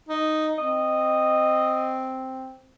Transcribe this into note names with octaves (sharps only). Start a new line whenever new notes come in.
D#4
C4 D#5